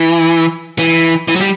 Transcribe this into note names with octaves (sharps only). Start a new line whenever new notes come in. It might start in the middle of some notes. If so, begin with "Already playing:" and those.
Already playing: E3
E3
E3
F#3
G3